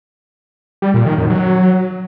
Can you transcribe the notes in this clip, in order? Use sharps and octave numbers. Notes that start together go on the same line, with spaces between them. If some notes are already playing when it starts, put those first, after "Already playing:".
G3
A#2
D#3
F#2
F#3